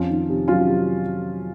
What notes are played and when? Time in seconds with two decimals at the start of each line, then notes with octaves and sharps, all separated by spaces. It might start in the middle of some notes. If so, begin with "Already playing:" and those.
Already playing: F2 C#4 F4
0.09 D#3
0.29 C3
0.48 F#3 C#4 F4
0.67 C3